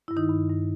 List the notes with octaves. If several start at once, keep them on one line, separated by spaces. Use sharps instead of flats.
G2 E4
D#3 D#4
G2
G2